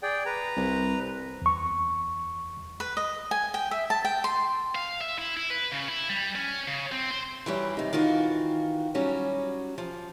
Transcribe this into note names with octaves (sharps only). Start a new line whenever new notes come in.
G#4 D5 G5
B4 A#5
C2
E2 C#6
B4
D#5
G#5
G5
E5
A5
G5
C6
F5
E5
E4
E4
B4
C#3
E4
G3
C#4
C#3
C4
C5
E3 F#3 G3
C3 D#4
D#3 E3 F4 F#4
F#3 G3 C#4 F#4
F3